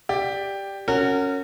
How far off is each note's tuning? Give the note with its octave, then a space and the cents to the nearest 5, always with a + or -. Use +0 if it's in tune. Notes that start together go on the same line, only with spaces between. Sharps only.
G4 +5 D5 +0
C#4 +0 F#4 +0 A#4 -30